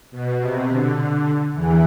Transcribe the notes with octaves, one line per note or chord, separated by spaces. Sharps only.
B2
C3
D3
E2 E3